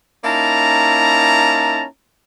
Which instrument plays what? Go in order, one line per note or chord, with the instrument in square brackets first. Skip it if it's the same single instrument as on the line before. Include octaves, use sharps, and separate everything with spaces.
[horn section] A#3 C#4 D#4 E4 A5 A#5